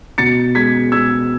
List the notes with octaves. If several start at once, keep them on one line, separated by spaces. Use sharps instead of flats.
B2 A6 C#7
G#3 G#6 B6
G#3 E6 G#6